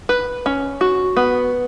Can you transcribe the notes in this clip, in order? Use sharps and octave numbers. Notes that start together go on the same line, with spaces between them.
B4
C#4
F#4
B3